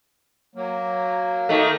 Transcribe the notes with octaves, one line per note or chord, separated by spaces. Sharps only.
F#3 A#3
D#3 A3